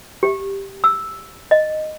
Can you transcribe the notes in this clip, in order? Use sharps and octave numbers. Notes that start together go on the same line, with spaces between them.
G4
E6
D#5